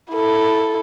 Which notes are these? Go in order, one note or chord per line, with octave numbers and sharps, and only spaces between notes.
E4 A4